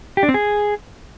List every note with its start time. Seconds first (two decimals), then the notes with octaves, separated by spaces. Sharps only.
0.17 G4
0.23 D4
0.29 C4
0.34 G#4